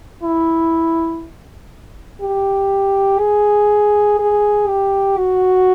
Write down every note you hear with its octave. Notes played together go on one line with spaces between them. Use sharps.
E4
G4
G#4
G#4
G4
F#4